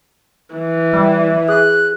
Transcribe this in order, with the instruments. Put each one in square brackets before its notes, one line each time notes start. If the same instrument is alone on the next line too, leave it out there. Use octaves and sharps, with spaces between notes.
[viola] E3
[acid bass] G3 [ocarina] E5
[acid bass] G#4 [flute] F#6